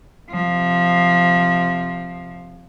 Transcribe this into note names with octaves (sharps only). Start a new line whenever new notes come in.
C3 F3